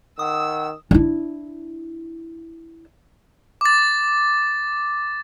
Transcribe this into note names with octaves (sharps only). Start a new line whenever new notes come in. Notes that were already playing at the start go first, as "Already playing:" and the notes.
D#3 F#5 D#6 E6
D4 E4
D6 A6